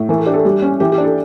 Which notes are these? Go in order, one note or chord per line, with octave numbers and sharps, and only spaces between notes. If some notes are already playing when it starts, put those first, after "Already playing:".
Already playing: A2
E3 A#4
A4
D4 G4
A4
G3 G4
C#4
E3 G4
G4
D4
A4